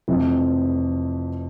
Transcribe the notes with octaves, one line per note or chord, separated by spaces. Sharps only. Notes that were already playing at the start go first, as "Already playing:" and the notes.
F1 F2 C3 E3